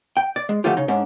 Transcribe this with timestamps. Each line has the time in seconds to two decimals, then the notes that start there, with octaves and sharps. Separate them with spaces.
0.17 G5
0.36 D5
0.49 G#3
0.64 D3 F3 A3 C#4 F4 G4
0.77 C#3 D#4
0.88 G#2 C#4 D4